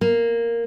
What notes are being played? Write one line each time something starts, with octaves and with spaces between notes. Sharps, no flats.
A#3